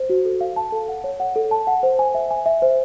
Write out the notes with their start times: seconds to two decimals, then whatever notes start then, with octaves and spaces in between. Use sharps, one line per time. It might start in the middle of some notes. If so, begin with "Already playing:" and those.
Already playing: C5
0.10 F#4
0.25 A4
0.41 F5
0.56 A5
0.72 A4
0.88 F#5
1.04 C#5
1.20 F#5
1.36 A4
1.51 A5
1.67 F#5
1.83 C5
1.99 G#5
2.14 E5
2.31 G#5
2.46 E5
2.62 C5